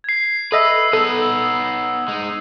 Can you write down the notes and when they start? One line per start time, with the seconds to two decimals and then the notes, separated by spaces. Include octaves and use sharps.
0.04 G#6 C7
0.52 A4 B4 D#5 E5 D#6 E6
0.93 B3 D#4 A4 E6
2.08 G#3 D#4